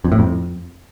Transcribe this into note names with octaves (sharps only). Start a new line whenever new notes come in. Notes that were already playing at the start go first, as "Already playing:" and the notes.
F2
A2
F2